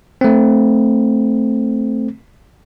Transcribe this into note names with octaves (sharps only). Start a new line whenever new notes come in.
A3 C4